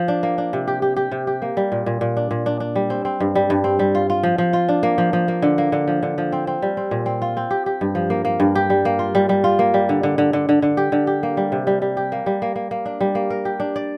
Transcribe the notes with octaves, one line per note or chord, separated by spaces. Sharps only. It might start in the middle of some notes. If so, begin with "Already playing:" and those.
Already playing: F3
D4
A#3
D4
C3
G4
G4
G4
C3
G4
A#3
G3
A#2
A#2
A#2
D4
A#2
D4
D4
G3
C4
C4
G2
G3
G2
C4
G3
F4
F4
F3
F3
F4
D4
A#3
F3
F3
A#3
D3
A#3
D3
F3
D3
F3
C4
C4
G3
C4
A#2
C4
F4
C4
G4
G4
G2
F3
A#3
A#3
G2
G4
G3
A#3
F4
G3
G3
F4
A#3
G3
D3
D3
D3
D3
D3
D3
G4
D3
G4
A#3
G3
C3
G3
G3
G4
A#3
G3
A#3
A#3
A#3
D4
G3
A#3
A#4
G4
D4
D5